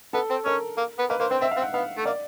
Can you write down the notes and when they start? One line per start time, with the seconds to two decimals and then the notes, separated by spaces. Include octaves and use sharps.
0.13 B3 A4
0.30 C4
0.45 C#4 A#4
0.77 A#3
0.99 B3
1.10 A#3 B4
1.20 A#3 C5
1.31 C4 C5
1.41 C4 E5
1.51 F5
1.57 C4
1.62 F#5
1.73 B3 F5
1.98 A3
2.06 A#3 D5